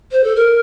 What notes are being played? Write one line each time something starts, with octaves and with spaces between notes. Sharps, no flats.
C5
A4
A#4